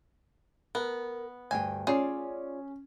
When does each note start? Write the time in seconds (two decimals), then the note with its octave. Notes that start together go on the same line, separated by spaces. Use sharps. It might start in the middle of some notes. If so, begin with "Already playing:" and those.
0.75 B3 A#4
1.51 D2 G2 G5 G#5
1.87 C#4 F4 G#4 C#5 D5